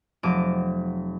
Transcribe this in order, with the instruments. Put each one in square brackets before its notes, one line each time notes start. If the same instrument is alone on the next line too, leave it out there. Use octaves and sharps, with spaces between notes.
[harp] F1 F#3 D6 D#7